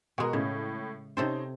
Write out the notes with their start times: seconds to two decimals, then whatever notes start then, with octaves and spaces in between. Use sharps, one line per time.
0.18 B2 G#3 F#4 A#4
0.33 A2 C#3
1.17 C3 C4 C#4 D#4 A4 C5